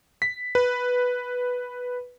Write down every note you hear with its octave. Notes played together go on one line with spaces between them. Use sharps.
B6
B4